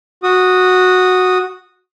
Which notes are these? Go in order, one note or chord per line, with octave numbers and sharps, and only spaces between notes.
F#4 D#6